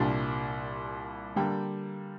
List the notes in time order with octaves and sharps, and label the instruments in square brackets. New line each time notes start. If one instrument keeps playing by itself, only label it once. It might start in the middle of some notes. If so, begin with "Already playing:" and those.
Already playing: [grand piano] C2 A#2 G3 D4
D3 G3 A#3 G5